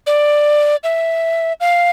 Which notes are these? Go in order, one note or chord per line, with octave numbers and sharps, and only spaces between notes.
D5
E5
F5